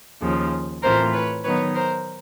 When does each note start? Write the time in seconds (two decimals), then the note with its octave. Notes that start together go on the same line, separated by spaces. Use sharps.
0.21 D#2 C#3 F3
0.83 A2 E3 A3 C4 F4 A#4 C5
1.13 B4 C#5
1.44 D#3 F#3 B3 D#4 B4 C#5
1.75 A#4 C5